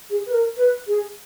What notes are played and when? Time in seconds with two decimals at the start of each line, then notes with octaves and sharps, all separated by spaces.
0.10 G#4
0.26 B4
0.32 A#4
0.57 B4
0.87 G#4